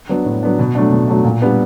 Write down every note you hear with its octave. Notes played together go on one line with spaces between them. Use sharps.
F#3 B3 D4
A2
F#3 B3 D4
B2
F#3 A3 D4
B2
F#3 A3 D4
A#2
G3 B3 D4